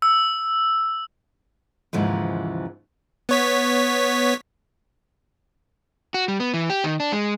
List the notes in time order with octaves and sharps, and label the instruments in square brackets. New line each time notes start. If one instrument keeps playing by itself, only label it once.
[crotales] E6
[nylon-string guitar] D#2 G#2 C#3 E3 F3
[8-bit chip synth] B3 C#5 B6
[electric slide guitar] F#4
G3
B3
E3
G4
D#3
D4
G#3